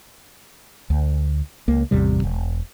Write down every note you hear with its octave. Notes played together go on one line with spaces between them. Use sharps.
D2
C#2 A#3
A1 E2 C3 G3
E1